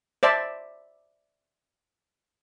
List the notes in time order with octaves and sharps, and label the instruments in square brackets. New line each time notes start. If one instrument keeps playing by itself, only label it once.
[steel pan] C5 D5 E5 A5